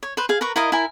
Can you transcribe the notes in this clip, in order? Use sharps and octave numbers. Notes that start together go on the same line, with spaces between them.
C#5
B4 C5
G#4 F5
A#4 B4 A#5 C#6
E4 A#4 D#5 F5
E4 A#4 G#5